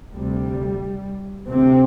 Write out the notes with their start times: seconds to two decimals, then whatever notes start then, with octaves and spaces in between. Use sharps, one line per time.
0.14 D2 C3 G3
1.48 D2 C3 C4